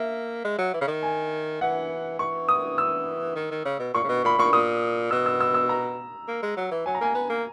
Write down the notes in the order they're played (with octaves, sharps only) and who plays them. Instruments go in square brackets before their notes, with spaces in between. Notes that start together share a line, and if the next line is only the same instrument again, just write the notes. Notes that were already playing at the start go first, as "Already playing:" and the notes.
Already playing: [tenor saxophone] A#3 [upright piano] E5
[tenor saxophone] G#3
F#3
E3
C#3
D#3
[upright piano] G#5
[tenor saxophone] E3 [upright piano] F#5
[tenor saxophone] E3 [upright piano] C#6
[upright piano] D#6
E6
[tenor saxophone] D#3
D#3
C#3
B2
[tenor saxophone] A#2 [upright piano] C#6
[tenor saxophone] C#3
B2
[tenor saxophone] A#2 [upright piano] B5
[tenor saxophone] A#2 [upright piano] C#6
[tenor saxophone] A#2 [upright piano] D#6
[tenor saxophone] B2 [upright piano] E6
[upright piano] E6
E6
E6
A#5
[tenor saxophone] A#3
G#3
F#3
E3
[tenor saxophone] F#3 [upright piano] G#5
[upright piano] A#5
[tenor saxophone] A#3 [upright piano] G#5
[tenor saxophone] B3
A#3